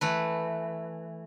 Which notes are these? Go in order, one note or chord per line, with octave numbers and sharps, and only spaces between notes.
E3 A3 B4